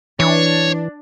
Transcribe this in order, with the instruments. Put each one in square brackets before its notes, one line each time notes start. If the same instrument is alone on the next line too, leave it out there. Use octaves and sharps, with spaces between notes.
[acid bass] E3 [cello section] D4 [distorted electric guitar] C#5